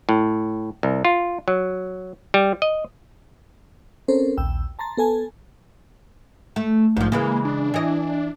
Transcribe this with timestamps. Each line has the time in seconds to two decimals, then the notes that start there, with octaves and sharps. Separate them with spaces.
0.09 A2
0.83 C2
1.05 F4
1.48 F#3
2.34 G3
2.62 D#5
4.08 C4 C#4 A4 A#4 C5
4.37 A#1 D#2 G5 E6
4.79 A5 A#5 C6 A6
4.97 B3 A4 G#5 A5
6.56 A3
6.97 A#1 G#2 F3
7.12 C#3 E3 G#3 A#3
7.45 D4
7.74 E3 D#5